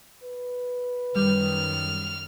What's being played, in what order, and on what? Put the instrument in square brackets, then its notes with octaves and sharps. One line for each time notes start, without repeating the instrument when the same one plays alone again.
[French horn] B4
[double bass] F#2 D#3 [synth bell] G3 [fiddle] F6